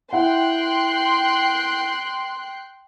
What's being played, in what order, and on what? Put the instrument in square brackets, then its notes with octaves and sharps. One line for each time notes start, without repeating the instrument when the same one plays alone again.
[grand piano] E4 F#5 [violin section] G5 C6 F#6